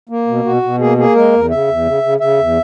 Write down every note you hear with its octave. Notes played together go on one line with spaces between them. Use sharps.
A#3
B2
B2 F#4
B2
A#3 G#4
A#3 G#4
G#3 A#4
E2
C#3 E5
E2
C#3
C#3
C#3 E5
E2